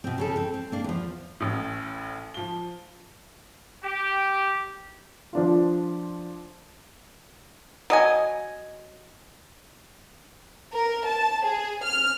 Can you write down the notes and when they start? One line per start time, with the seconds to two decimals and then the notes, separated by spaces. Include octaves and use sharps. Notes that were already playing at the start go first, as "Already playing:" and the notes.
0.04 B2 C4
0.18 C#3 C#4 A4
0.36 C4 A4
0.54 C4
0.72 A#3 D4
0.84 E2 F3
1.40 A1 A2
2.34 F3 G7
3.83 G4
5.33 F3 D4 F4
7.90 F#3 D#5 G#5
10.71 A#4
11.05 A5
11.43 G#4
11.84 F6